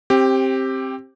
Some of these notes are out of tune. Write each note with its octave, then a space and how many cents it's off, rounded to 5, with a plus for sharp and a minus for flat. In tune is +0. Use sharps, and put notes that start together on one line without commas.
C4 +20 G4 +0